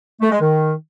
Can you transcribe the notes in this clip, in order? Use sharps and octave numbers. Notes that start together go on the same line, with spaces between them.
A3
G#3
D#3